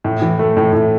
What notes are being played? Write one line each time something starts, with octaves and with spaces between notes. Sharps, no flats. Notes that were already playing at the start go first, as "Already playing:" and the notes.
A2
E3
A3
A2
A2